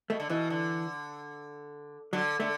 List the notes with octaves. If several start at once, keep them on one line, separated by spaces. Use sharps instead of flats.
B2 A3
D3
B2 E3
D3
D3 F#3
D3 A3